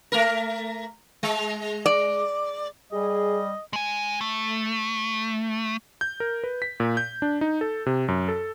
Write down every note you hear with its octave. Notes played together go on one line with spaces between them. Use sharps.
A3 A#4
G#3
D5
G3 G#4 D#5
G#3 G#5
A3
G6
A#4
B4
B6
A#2
G6
D4
D#4
A4
C3
F#2
A4